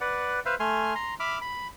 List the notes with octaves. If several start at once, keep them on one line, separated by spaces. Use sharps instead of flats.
B4 D5 F#5
B4 C5 E5 F5
A3 G#5 C6 F6
A#5 C6
E5 B5 D6 F6
B5